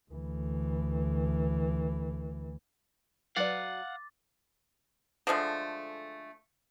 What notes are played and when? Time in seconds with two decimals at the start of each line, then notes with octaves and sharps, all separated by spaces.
0.11 D2 E3
3.36 F#3 B4 D5 F5 F#5 D6 A6
5.27 D3 F3 G#3 A3